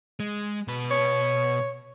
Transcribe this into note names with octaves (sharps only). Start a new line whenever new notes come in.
G#3
B2 B4
C#5